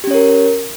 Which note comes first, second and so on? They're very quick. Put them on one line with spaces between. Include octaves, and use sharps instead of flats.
G4 C#4 C#5 A#4